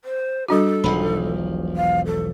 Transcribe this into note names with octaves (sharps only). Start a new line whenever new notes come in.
C5
G3 D4 F#4 A4
E1 B1 F3 B5
F5
A4